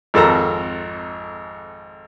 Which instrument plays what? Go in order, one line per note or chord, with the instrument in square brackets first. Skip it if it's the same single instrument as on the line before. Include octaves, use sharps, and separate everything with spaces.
[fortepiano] G#1 F2 A4 A#4 A#5